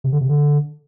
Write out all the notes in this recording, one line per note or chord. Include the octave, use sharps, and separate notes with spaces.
C3
D3
C3
D3